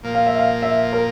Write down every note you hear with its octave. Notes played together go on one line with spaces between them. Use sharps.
A#2 F3 A#3
F5
E5
F5
E5
A#4